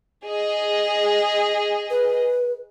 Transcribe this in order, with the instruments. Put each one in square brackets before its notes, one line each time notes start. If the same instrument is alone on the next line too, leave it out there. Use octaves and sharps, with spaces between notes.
[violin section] G#4 D#5
[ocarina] B4